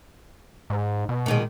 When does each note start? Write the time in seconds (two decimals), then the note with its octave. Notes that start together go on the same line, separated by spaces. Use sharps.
0.70 G#2
1.09 B2
1.26 A#2 D#3 G#3